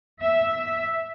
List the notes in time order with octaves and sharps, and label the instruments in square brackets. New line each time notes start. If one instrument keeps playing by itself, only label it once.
[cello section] E5